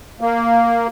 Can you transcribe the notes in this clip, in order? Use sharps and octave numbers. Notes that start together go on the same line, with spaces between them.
A#3